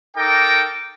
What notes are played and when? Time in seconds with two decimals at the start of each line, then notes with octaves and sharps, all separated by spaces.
0.17 D#4 A4 A#4 G5 D6